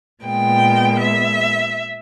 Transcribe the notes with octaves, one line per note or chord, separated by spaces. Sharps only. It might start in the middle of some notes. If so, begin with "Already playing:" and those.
A#2 G#3 B3 G5
E5